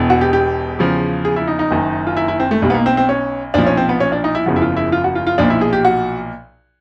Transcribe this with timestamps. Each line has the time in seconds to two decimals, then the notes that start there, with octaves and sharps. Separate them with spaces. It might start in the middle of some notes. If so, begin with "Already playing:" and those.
Already playing: E1 E2 B2
0.10 F#4
0.21 G4
0.33 G4
0.79 E2 C#3 F3
1.25 G#4
1.36 E4
1.47 D#4
1.59 D#4
1.71 F#1 F#2 D#3
2.07 F4
2.17 E4
2.28 E4
2.40 C4
2.51 A3
2.62 B1 B2 G3
2.70 B3
2.74 A#3
2.86 C4
2.97 C4
3.09 C#4
3.54 B1 A#2 F3 D4
3.67 C#4
3.77 C4
3.89 B3
4.00 C#4
4.12 D4
4.24 D#4
4.35 E4
4.46 F#1 E2 C#3 F3 F#4
4.56 E4
4.62 F4
4.77 E4
4.92 F4
5.04 F#4
5.15 F4
5.27 F4
5.38 B1 A#2 F3 D4
5.50 E4
5.61 G#4
5.73 G4
5.85 F#4